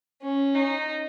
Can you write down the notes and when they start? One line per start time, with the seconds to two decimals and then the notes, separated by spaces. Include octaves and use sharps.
0.21 C#4
0.55 D#4